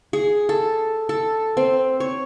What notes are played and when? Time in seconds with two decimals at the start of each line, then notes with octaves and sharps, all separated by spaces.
0.13 G#4
0.49 A4
1.09 A4
1.57 C4
2.00 C#5